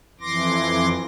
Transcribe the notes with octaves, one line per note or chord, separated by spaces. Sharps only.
F2 E3 C6 D6 A#6